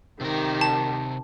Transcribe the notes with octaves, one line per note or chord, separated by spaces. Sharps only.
C3 D#3 G4 A#4
A5